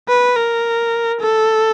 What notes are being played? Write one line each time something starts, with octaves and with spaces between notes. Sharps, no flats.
B4
A#4
A4